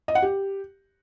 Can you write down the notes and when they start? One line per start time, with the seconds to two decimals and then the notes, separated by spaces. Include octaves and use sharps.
0.08 D#5
0.15 F#5
0.22 G4